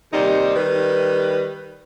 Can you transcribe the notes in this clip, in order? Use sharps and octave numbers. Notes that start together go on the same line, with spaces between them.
D#2 C3 G3 D#4 C5
D#3 G3 B4